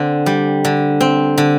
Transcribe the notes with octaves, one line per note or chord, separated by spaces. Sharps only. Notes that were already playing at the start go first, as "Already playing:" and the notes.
Already playing: D3 C4
G3
D3
C4
D3